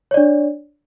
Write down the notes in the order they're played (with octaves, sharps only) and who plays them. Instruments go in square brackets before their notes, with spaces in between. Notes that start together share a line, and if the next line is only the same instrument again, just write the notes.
[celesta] C#5
D5
D4